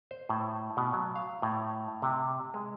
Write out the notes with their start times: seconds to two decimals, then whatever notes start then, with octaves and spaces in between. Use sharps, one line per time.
0.11 C5
0.29 A2
0.77 B2
0.93 F#3
1.16 F5
1.42 A2
2.02 C3
2.54 G#3